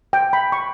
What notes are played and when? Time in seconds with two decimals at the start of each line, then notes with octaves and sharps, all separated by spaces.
0.13 G5
0.33 B5
0.52 C#6